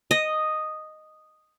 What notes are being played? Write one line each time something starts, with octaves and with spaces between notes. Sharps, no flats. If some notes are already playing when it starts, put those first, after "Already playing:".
D#5